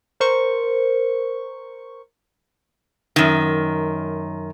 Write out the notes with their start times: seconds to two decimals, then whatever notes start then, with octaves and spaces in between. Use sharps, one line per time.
0.20 A#4 C5 C#6
3.16 F#2 D#3